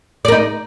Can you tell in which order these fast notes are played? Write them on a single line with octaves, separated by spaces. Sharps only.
D5 A#4 D#4